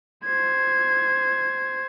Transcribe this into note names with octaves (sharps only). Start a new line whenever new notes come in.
C5 G#6